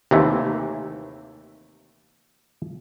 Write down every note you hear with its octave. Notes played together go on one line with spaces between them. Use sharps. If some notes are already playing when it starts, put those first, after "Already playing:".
D#2 C3 E3 A3